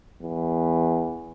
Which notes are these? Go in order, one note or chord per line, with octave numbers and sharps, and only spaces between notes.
E2